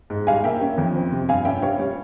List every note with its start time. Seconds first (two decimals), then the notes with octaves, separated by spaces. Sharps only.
0.10 G#2
0.27 G3 F5 G#5
0.44 A#3 E5 G5
0.61 C#4
0.78 F2
0.96 C4
1.12 C3
1.29 G2 F5 G#5
1.45 C#4 E5 G5
1.62 G3 C#5 F5
1.80 G3